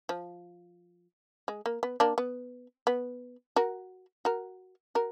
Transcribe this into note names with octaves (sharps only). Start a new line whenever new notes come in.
F3
G#3
A#3
B3
A#3 D4
B3
B3
F#4 A#4
F#4 A#4
F#4 A#4